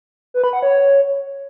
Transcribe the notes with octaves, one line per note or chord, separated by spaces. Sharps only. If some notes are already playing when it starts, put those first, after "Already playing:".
B4
B5
F#5
C#5